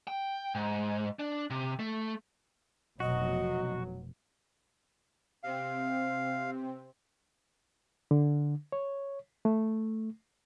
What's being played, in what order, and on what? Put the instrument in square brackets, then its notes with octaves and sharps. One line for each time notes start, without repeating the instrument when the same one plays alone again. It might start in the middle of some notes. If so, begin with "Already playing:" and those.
[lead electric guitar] G5
G#2
D4
C3
A3
[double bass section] F1 B2 [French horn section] F#3 [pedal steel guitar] F#4 [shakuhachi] D#5
[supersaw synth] C3 C4 [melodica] F5
[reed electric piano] D3
C#5
A3